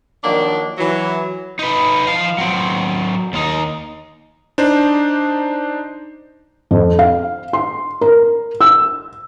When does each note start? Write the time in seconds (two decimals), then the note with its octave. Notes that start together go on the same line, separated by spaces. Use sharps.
0.24 D#3 F3 F#3 A#3 D4
0.78 E3 F#3
1.59 D#4 B4
2.07 F3 F5
2.38 F#3 C4
3.33 D#2 D#4
4.58 D4 D#4 C5
6.71 F2
6.99 F5
7.53 C6
8.01 A#4
8.61 E6